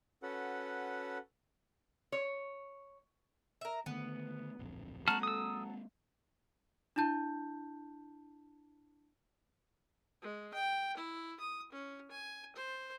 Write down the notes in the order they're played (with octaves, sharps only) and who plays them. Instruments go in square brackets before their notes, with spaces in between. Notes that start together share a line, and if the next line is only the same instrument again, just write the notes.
[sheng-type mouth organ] C#4 F#4 A4 B4 F#5
[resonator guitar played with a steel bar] C#5
[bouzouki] A#4 E5
[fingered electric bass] D3 D#3 A3 [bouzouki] B3
[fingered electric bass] D1 A#1 F2
[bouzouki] F#3 A4 [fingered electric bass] G#3 A#3 C4 [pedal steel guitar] F#4 A5 F6
[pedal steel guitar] D#6 E6
[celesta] D4 E4 A5 G6
[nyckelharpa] G#3
G5
E4
D#6
C#4
G#5
C5